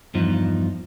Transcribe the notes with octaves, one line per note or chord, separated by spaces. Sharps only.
E2 G2 F3 D#4